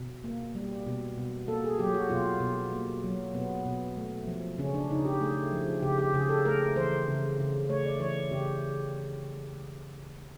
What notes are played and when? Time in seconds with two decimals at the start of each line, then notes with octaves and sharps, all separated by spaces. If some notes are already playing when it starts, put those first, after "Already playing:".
Already playing: B2
0.24 A#3
0.55 G3
0.87 B2
1.17 B2
1.48 A#3 A4
1.64 G#4
1.79 F#3 G4
1.94 F#4
2.10 B2 F4
2.41 B2
2.72 A#3
3.04 F#3
3.34 B2 B3
3.66 B2
3.97 A3
4.27 F3
4.58 C#3 C#4
4.74 D4
4.90 C#3 D#4
5.05 G4
5.20 A3 G#4
5.52 F3
5.83 C#3 G4
5.98 G4
6.14 C#3 G#4
6.29 A4
6.45 A3 A#4
6.76 E3 C5
7.08 C#3
7.38 C#3
7.69 A3 C#5
7.86 D5
8.00 E3 C#5
8.31 C#3 G4